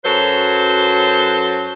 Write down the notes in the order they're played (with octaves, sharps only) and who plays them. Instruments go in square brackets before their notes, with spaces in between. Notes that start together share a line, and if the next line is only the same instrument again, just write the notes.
[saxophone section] F#2 F#3 A4 B4 C5